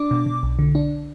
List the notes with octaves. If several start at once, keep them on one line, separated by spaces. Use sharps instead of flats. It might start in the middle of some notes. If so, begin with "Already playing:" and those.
Already playing: D4 D6
B2
B2
B1
D3
D4